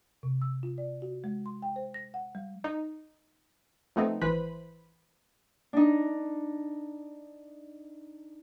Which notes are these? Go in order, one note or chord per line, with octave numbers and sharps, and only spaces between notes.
C3
E6
F4
D5
F#4
G#3
C6
G5
C5
A#6
F#5
G3
D#4
F3 A3 B3 C4 D#4
G#1 E3 B4 C5 B5
D4 D#4